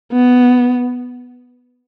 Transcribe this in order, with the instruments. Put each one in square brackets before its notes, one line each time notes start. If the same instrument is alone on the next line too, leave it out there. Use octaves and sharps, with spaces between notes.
[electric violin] B3